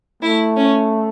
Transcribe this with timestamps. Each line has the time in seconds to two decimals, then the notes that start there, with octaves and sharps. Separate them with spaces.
0.23 A3 E4
0.57 C#4